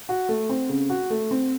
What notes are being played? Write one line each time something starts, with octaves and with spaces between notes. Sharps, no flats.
F#4
A3
C4
C#3
F#4
A3
C4